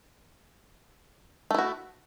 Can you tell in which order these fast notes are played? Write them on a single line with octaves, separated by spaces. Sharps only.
A3 E4 F#4